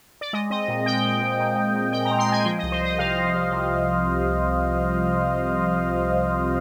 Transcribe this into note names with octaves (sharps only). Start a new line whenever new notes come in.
D5
G#3 D#5
C4 D#5
A#2
G#3 G5
G#3
A#2
A#2
A#2
A#2
G#3 G5
A#5
C4
C6
G#3 G#5
F3 G5
D#5
C2
C5
C2 D#5
C3 F5
C3
C2
C3